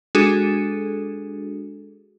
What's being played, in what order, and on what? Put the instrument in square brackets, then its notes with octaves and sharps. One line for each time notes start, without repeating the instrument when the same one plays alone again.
[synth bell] G#3 D4 F#4 G#4 A4